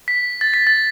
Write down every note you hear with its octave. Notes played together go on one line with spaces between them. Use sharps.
B6
A6
B6
A6